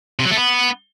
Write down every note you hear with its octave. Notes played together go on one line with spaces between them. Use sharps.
C3
F#3
A3
B3